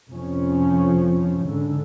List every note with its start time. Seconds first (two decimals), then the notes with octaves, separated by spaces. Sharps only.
0.10 F1 F2 F3 C#4
1.42 G#2 D3